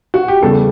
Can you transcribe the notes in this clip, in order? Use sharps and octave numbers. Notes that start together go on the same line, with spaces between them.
F#4
G4
E2 C#3 G3 A4